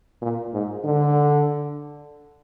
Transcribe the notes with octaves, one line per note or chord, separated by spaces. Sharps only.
A#2
G#2
D3